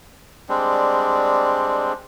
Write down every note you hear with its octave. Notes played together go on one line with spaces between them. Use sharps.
G3 G#3 C4 D4